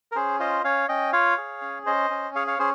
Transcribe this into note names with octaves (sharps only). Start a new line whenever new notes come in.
A#4
C#4 G#4 C5
F4 C5 D#5
C#4 C#5 F5
C#4 D#5 G5
F4 C#5 F5
G#4
C#4
C#4 C5 D#5
C#4
G#4 C#5 F5
C#5 F5
C#4 G#4 C5